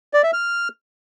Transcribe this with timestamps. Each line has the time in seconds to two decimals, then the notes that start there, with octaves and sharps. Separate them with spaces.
0.14 D5
0.23 E5
0.33 F6